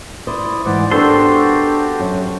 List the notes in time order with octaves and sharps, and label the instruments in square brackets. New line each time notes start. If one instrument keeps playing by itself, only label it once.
[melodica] E4 D5 D#6 [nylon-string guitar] C5
[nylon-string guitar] G#2 E3 [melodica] C5 D5 F#5
[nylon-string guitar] B3 D4 A#4 [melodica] F#4 G4 [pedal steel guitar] A4 C5 C6
[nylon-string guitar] F#2